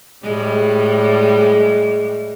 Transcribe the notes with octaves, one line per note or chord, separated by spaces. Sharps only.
A2 G3 G#3